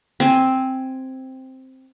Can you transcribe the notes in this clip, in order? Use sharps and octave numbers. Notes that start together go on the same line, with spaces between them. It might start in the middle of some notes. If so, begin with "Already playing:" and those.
C4 G#5